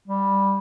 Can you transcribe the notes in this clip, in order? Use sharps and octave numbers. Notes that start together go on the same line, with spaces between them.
G3